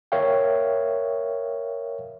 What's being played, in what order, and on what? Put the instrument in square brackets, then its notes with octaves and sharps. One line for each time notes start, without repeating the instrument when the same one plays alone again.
[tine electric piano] A#4 C#5 E5 F5 G5